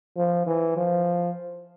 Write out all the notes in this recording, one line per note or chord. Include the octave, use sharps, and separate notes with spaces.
F3
E3
F3